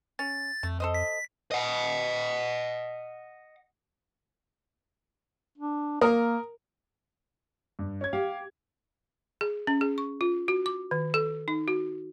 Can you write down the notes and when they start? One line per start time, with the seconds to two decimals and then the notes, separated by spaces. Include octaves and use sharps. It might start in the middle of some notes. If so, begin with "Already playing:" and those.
0.19 C#4 A6
0.63 F2 A3
0.80 A4 C5 D#5
0.94 B6
1.51 D#5 F#5
5.58 D4
6.01 A#3 A#4 D#6
7.79 G2
8.01 C#4 G#6
8.13 G4 F5
9.41 G#4
9.67 C#4
9.81 G#4
9.98 C#6
10.21 F4
10.48 F#4
10.66 D6
10.91 D#3
11.14 A4
11.48 D#4
11.68 F#4